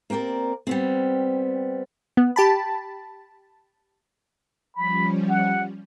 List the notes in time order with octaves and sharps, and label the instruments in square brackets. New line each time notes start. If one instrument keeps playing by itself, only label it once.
[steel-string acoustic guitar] A#3 C4 G4 A#4 D5
G3 B3 C4
[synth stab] B3
G4 A5 B5
[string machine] F3 G3 C#4 [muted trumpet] B5
[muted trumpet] F#5